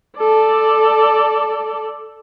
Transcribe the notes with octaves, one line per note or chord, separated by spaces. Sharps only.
A4 D5